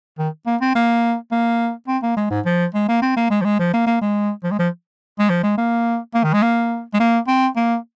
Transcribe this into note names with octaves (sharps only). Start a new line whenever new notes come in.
D#3
A#3
C4
A#3
A#3
C4
A#3
G#3
G#2
F3
G#3
A#3
C4
A#3
G#3
F3
G#3
F3
A#3
A#3
G#3
F3
G#3
F3
G#3
F3
G#3
A#3
A#3
D#3
G#3
A#3
G#3
A#3
C4
A#3